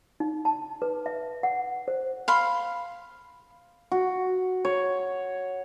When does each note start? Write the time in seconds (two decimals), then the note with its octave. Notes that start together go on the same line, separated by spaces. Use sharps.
0.20 D#4
0.45 A5
0.82 B4
1.06 E5
1.43 F#5
1.88 C5
2.28 F5 B5 C6
3.91 F#4
4.65 C#5